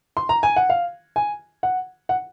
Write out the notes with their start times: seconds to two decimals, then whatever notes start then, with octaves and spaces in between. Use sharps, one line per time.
0.17 C6
0.29 A#5
0.43 G#5
0.56 F#5
0.70 F5
1.16 G#5
1.63 F#5
2.09 F#5